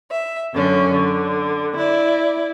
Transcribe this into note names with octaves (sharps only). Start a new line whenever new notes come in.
E5
F#2 D3 C#4
D3
E4 D5